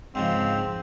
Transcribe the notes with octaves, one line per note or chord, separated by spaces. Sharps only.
G#2 C#3 F3 C4